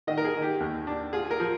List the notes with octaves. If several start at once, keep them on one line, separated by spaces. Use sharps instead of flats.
D#3 D#5
A#4
G#4
D#3
G4
D#2
D4
F4 G#4
A#4
F3